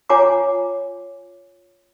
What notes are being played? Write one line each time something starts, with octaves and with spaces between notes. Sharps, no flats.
F4 C#5 F#5 G#5 A#5 D6